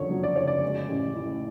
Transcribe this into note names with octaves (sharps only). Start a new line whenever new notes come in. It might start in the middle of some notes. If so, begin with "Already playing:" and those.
Already playing: F#1 F2 D3 C#5
F#3
D5
F#1 C#5
D5
G#3
A1
A2